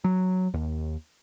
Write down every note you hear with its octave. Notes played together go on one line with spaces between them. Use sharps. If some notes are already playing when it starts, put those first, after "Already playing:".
F#3
D#2